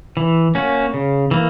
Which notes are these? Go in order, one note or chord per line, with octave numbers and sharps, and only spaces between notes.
E3
A#3 C#4 F#4
C#3
E3 A#3